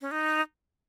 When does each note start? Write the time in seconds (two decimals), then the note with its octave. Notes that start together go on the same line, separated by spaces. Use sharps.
0.01 C#4
0.11 D#4